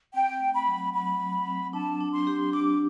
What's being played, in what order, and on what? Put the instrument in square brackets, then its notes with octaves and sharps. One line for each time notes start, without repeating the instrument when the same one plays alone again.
[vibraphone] C4 [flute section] G5
[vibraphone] A3
[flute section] B5
[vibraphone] F#3
[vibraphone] F#3 [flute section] B5
[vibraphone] F#3
C4
[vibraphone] D4 [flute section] A5
[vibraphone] D4
[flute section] C6
[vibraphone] G4
[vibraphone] D4 [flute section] D6